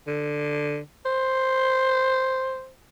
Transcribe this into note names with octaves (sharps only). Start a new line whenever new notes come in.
D3
C5